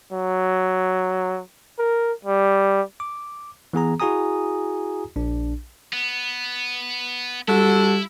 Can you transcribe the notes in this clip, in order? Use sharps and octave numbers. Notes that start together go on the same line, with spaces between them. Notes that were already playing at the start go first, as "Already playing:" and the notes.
F#3
A#4
G3
D6
E3 B3 G#4 A#5
E4 F#4 G#4 G#5 A#5 D#6
A#1 D4
B3
D3 G3 E4 F#4 A4